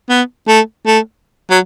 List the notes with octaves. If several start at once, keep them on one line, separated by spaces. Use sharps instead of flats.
B3
A3
A3
F#3